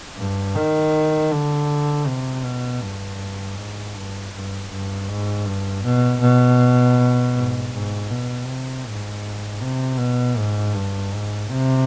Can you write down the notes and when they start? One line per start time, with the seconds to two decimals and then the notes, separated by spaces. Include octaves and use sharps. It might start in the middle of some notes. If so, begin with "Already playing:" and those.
0.17 G2
0.55 D#3
1.31 D3
2.06 C3
2.43 B2
2.81 G2
3.56 G#2
3.95 G2
4.33 G2
4.70 G2
5.08 G#2
5.46 G2
5.84 B2
6.21 B2
7.34 G#2
7.73 G#2
8.10 B2
8.47 C3
8.86 G#2
9.61 C3
9.98 B2
10.37 G#2
10.74 G2
11.12 G#2
11.49 C3